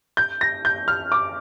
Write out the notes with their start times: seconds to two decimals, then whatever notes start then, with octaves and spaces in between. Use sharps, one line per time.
0.17 G6
0.41 A#6
0.65 G6
0.88 F6
1.12 D6